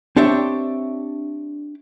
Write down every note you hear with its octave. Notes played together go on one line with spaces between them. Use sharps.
C4 D4 G4 C#5 D5 E5